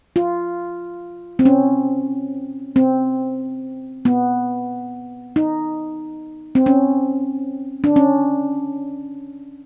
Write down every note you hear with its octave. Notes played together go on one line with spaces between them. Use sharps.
F4
C4
C#4
C4
B3
D#4
C4
C#4
D4
C#4